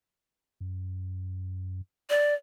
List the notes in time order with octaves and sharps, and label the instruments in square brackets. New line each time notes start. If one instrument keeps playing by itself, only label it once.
[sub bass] F#2
[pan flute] D5